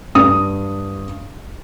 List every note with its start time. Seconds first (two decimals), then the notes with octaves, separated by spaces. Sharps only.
0.15 G2 D#6